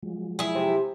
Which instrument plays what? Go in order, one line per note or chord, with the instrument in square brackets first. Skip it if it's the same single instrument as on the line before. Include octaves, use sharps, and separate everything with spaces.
[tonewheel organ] F3 F#3 G#3
[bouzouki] E4 G#4
[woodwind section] C3